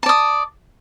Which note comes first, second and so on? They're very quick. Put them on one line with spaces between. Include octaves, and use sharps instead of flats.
A5 D5 D#6